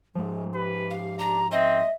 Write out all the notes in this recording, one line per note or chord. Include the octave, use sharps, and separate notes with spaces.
G#2 F3 G#3
G4 B4
F5
D4 A#5
C4 D#5 E5